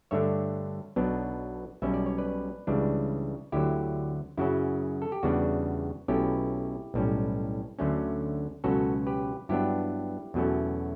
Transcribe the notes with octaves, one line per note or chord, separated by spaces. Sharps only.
G2 D3 A3 D4 C#5 E5
B1 B2 F#3 B3 D4
B1 B2 G3 C#4 E5
D5
C#5
B4 D5
C#2 C#3 E3 G3 D4
D2 D3 F#3 E4 G4
F#2 C#3 F#3 C#4 E4
A4
G4
E2 C#3 G3 B3 D4 F#4
B1 B2 A3 C#4 E4 G4
B1 A2 G3 C#4
D2 D3 F#3 A3 C#4
C#2 B2 F#3 C#4 F#4 A4
G4 B4
G2 F#3 B3 D4 E4 G4
E2 B2 F#3 A3 C#4